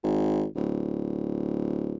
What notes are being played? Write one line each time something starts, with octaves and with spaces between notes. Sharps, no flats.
G#1
D1